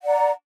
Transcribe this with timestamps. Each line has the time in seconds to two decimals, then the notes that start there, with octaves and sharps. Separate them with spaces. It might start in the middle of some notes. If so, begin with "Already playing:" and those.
0.01 F#5
0.04 D5
0.08 A#5